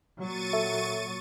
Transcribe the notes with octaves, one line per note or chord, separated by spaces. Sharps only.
A#2 F#3 C#6 A6 D#7
A4 E5